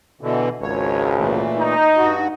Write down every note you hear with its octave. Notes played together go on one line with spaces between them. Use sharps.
B2 D3 E3
G#1 C#2 C#5
A#2 E3 A3
D#4
G2 F#4